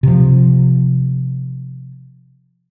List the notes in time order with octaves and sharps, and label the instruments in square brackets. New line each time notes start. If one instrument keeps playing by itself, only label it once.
[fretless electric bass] C3 F3